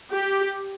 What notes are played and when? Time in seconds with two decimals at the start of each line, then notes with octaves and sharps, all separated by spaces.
0.12 G4